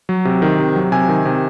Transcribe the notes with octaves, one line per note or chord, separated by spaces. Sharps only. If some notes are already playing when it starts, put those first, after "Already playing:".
F#3
C3
D#3
C3
F#3
C3 G#5
D#3
C3